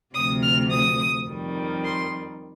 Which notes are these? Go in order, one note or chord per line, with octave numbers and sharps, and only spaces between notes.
D2 C3 F3 D#6
F6
D#6
F2 D#3 G3
C6